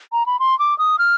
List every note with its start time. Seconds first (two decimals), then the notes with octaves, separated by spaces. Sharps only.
0.13 A#5
0.26 B5
0.39 C6
0.59 D6
0.78 D#6
0.99 F6